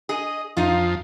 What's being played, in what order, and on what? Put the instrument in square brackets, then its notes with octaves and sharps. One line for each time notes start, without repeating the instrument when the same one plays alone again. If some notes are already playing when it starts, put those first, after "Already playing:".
[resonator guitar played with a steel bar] G#4 [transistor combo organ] D#5
[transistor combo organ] F2 F3 [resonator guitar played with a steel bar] D#4 F4